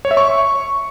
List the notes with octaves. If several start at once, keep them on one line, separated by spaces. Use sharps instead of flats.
C#5
E5
C#6